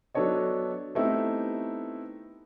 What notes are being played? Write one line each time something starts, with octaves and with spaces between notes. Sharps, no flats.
F#3 B3 D4 A4 C#5 D#5
A3 B3 C4 D#4 E4 G4